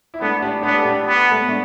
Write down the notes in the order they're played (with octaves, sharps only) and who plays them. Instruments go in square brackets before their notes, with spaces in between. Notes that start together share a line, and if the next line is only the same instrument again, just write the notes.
[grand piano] E4
[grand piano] A3 D4 [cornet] B3
[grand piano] D4 G4
[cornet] B3 [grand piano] D4 G4
[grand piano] A4
D4 G4
[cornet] B3
[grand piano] A3
B3
A3 D4